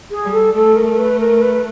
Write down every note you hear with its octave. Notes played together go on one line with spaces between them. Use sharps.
G#4
G3
A4
A3 A4
A#4
B4
A#4
B4